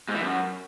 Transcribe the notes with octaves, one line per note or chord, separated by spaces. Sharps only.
G#2
E3
F#2